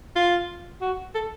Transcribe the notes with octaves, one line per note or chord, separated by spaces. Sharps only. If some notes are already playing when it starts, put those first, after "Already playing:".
F4
F#4
A4